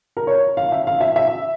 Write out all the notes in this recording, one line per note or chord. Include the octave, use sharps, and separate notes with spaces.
A#4
C#5
F5
E5
F5
E5
E5